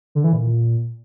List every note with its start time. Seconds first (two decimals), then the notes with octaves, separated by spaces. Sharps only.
0.15 D3
0.24 E3
0.33 A#2